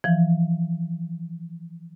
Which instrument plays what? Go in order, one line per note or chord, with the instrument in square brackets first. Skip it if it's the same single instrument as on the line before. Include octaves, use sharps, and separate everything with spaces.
[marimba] E3 F3